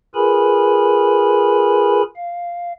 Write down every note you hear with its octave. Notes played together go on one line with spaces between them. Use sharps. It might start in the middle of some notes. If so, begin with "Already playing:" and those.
F4 G#4 A#4 B4 G#5 B5
F5